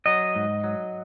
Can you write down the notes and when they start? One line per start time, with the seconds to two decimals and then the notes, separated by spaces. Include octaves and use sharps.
0.06 F#3 D#5
0.35 G#2
0.64 F#3